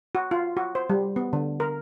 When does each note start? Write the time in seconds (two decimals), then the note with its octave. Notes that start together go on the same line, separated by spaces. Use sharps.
0.15 F#4
0.31 F4
0.57 F#4
0.75 C5
0.90 G3
1.16 B3
1.33 D3
1.60 A#4